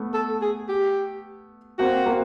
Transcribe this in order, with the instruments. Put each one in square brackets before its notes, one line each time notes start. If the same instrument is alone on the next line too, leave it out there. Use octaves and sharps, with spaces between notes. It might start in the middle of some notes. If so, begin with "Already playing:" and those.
Already playing: [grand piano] A3 B3
[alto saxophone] A4
G#4
G4
[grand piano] A#3 C4 [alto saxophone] F#4
[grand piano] A#3 C4